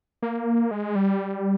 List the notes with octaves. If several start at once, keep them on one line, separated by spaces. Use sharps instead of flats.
A#3
G#3
G3